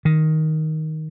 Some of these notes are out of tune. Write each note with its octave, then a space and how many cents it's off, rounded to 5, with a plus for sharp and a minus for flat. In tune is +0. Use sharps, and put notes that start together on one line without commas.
D#3 +5